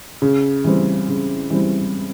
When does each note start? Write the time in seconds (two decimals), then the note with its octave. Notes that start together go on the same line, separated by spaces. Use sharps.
0.22 C#3
0.64 E3 G3 C4
1.08 C#3
1.50 E3 G3 C4